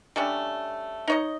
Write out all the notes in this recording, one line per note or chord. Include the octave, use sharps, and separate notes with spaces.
G3 A3 C#4 D4
D#4 C#5 D#5